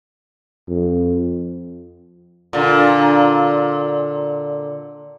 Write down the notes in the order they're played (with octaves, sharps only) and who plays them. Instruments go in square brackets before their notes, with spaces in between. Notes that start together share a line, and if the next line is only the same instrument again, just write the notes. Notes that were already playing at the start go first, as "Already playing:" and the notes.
[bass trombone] F2
[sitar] A#2 D3